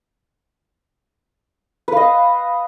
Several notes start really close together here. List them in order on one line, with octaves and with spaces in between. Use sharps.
B4 F5 D#5